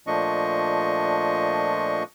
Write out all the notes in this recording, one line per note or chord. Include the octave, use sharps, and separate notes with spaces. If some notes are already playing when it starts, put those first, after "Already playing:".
A#2 F3 A3 D4 D#5 C#6